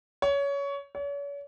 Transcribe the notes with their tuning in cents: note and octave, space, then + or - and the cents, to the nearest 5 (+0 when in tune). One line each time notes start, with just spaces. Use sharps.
C#5 +20
C#5 +40